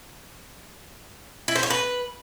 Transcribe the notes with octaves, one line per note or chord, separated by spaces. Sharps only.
E4
C5
C#5
B4